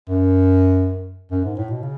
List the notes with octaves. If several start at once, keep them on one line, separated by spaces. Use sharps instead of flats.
F#2
F#2
G#2
A2
B2
C#3